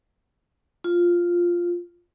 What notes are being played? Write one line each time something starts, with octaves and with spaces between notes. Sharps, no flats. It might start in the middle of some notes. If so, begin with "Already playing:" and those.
F4